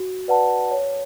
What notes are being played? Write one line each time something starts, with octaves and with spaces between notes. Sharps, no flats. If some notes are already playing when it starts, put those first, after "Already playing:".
Already playing: F#4
B4 D5 F#5 A5
C#5